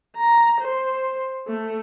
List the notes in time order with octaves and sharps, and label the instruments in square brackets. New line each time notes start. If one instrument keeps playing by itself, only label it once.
[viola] A#5
C5
A3